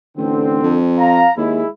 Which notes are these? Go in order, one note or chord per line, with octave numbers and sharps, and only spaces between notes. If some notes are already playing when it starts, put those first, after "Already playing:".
A1 D3 C4
F2
F5 A#5
D#2 G#3 E4